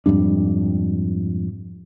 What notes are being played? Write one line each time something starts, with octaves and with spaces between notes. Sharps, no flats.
F2 G#2 G3 D4